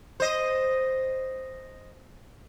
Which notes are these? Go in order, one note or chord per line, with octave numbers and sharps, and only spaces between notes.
C5 D#5